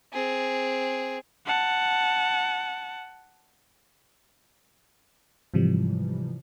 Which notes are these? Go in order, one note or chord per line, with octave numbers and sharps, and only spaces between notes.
C4 G#4
F#5 A5
G#2 C3 E3 F3 G3